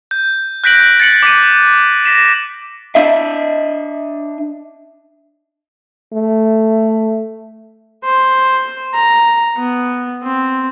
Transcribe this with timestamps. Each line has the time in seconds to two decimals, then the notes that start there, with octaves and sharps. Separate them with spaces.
0.11 G6
0.64 F#6 G6 A#6 B6 D7 F#7
1.00 A6 C#7 F#7
1.23 D6 B6 D#7
2.06 A#6 B6 E7
2.95 D4 D#5 E5
6.13 A3
8.05 C5
8.95 A#5
9.58 B3
10.23 C4